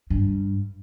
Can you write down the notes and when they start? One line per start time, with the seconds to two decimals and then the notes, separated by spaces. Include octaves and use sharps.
0.10 G2